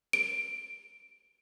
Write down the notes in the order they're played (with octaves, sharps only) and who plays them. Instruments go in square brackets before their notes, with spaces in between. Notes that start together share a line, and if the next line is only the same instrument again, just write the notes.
[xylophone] D7